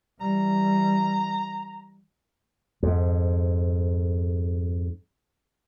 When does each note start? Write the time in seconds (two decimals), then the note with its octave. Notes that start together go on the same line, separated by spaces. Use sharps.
0.21 E3 G3 A#5
2.83 F2 G#2